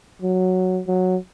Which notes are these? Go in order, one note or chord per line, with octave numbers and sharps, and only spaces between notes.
F#3
F#3